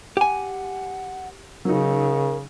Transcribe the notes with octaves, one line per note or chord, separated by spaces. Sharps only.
G4 F#5 G#5
C#3 F#3 D#4 A#4